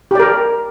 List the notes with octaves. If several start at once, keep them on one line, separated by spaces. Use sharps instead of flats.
G4 A#4 D5